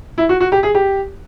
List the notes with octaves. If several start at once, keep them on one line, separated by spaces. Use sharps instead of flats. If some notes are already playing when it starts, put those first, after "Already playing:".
E4
F#4
F#4
G4
G#4
G4